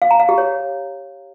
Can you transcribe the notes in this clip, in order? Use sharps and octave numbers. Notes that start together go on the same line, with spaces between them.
F5
A#5
F5
G4
C#5